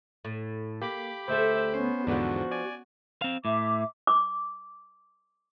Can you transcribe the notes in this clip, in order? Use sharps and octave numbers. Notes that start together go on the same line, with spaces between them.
A2
A#3 G4 B5 D6
D2 A4 C5 E5
B3 C#4 C5
E2 G#2 D3 F3 B3 D4 F#4
D5 G#5
C4 F5
A2 E5 D6
D6